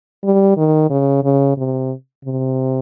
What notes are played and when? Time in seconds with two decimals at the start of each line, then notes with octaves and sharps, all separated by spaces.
0.24 G3
0.57 D#3
0.90 C#3
1.24 C#3
1.57 C3
2.25 C3